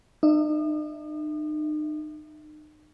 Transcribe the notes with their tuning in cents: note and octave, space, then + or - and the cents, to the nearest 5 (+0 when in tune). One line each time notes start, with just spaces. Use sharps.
D#4 -40 E5 +0